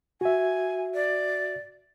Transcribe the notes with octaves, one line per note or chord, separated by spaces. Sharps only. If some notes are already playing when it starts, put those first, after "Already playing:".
F#4 E5 G#5
D5